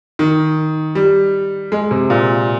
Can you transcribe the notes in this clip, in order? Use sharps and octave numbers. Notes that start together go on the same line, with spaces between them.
D#3
G3
G#3
C3
A#2